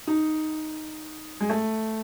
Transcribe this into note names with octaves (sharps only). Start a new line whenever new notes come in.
D#4
G#3
A3